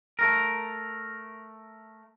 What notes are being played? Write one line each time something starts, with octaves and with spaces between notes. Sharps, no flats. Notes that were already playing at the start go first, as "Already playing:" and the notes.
A3 A#4